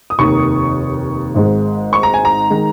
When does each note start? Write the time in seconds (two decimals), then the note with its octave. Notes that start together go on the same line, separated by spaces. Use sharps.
0.10 D#6
0.18 F1 D#2 D#3 C#6
1.34 G#1 G#2 G#3
1.93 C#6
2.03 A#5
2.14 G#5
2.25 A#5
2.50 D#3 G#3